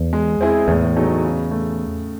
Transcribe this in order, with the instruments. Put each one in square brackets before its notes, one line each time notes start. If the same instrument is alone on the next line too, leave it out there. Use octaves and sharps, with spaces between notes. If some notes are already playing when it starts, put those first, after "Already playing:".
Already playing: [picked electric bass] E2
[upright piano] G#3
C4 E4 G#4 C5
[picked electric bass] E2 [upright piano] A2
[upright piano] F#3 A3 D#4 G#4
C#3
A3